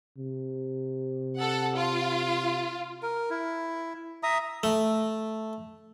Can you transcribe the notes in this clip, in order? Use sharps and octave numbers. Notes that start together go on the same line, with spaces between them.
C3
A4 F#5
F4
A#4
E4
E5 A#5 D#6
A3